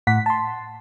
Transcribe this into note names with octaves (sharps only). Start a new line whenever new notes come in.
A2 F#5 B6
A5 C6